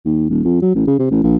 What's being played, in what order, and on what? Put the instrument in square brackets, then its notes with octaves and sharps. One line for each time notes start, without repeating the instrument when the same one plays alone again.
[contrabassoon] D#2
D#1
F2
F#3
A1
C#3
C3
A1
A#1